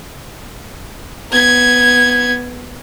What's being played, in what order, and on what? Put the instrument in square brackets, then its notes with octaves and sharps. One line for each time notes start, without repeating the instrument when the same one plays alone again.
[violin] B3 G#6